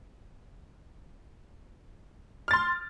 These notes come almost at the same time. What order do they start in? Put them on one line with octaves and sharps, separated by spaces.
F6 A6 C6